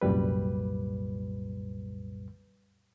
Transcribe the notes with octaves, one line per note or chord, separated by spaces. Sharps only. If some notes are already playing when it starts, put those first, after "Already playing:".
C2 F#2 A#2 G3 B4